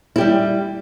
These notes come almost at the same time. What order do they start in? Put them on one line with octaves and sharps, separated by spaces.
E4 G4 G3